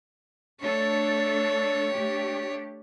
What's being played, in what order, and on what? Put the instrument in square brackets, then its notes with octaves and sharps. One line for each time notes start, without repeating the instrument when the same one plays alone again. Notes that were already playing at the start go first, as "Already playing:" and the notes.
[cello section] A3 D4 A4 [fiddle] C#5
[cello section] A3 D4 G4